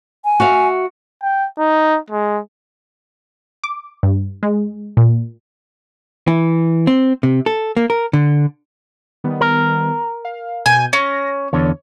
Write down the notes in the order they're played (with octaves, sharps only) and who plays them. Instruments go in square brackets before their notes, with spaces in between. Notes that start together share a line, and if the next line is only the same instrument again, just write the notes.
[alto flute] G#5
[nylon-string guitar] F#4 E5 F5
[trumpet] G5
D#4
G#3
[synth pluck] D6
G2
G#3
A#2
[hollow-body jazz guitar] E3
C4
C3
A4
A#3
A#4
D3
[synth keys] D#3 G3 B3
[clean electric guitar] A#4
[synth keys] F5
[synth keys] B2 G6 [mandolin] G#5
[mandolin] C#4 [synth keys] A#6
[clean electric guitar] E2 D3 [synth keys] C#5